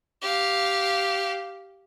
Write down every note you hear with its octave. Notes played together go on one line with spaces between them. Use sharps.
G4 F5